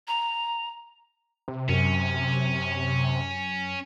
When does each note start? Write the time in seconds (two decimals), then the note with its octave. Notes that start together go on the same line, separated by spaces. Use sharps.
0.08 A#5
1.48 C3
1.69 F#2 C#4